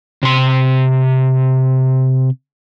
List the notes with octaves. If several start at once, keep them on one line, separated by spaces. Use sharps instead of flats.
C3 C6